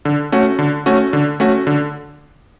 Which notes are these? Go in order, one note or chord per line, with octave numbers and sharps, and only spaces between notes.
D3
A3 C#4 F#4
D3
A3 C#4 F#4
D3
A3 C#4 F#4
D3